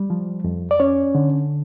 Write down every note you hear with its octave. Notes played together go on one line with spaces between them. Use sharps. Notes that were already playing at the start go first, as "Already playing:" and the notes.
Already playing: G3
F3
F2
D5
C#4 C#5
D3